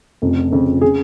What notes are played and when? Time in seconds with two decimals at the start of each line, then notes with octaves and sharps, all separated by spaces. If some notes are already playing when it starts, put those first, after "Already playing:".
0.22 F1 F2 C#3
0.51 F1 F2 C#3
0.81 C#3 G#4